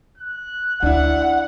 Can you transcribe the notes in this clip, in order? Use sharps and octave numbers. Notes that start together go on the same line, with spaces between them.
F#6
D2 D4 E4 F#5